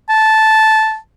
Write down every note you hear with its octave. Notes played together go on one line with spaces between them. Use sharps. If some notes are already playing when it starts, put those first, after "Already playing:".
A5